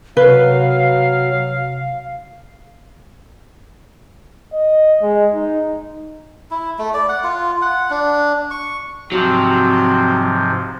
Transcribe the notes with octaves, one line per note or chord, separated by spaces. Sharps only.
C3 F#3 B4 F5
D#5
G#3
D#4
E4
A3
D5
F#5
F4
F#5
D4
C#6
G#2 C3 F3 F#3 C4